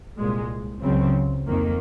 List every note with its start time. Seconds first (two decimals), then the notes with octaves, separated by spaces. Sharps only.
0.18 C2 A#2 G#3
0.83 C#2 C#3 F#3 C4
1.47 F2 D#3 A#3